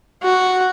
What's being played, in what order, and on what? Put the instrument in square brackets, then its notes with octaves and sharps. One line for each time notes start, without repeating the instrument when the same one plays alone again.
[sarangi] F#4